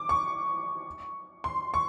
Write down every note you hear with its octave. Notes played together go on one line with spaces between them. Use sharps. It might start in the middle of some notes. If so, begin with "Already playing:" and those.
Already playing: D6
C#6
C6
C#6